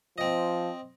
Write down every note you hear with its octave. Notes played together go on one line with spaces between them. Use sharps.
F3 C4 D#5